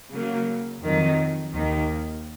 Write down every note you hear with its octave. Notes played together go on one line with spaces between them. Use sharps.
C#3 F#3 A#3
F2 D#3 F#3
D#2 D#3 A#3